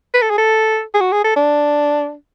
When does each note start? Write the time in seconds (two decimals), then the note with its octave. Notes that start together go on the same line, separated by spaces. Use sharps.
0.14 B4
0.22 A4
0.30 G#4
0.38 A4
0.94 G#4
1.01 F#4
1.12 G#4
1.24 A4
1.36 D4